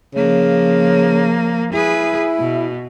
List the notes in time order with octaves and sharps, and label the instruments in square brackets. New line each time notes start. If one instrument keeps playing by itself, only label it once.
[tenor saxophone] C#3 [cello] F3 A#3
[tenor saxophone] E4 [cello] G#4 B4
[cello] B2